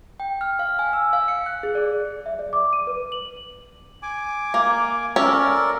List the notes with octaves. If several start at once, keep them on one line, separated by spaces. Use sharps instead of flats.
G5
F6
F5
G#5
E6
F5
C#7
F#6
G#4
D5
E5
D5
D6
D#7
B4
F#7
G#5 D6
A#3
C#4 A4 A#4 D5